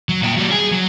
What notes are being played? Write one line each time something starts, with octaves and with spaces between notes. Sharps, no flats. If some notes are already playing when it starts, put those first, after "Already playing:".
F#3
A#2 G5
F#3 G3
G#4
F#3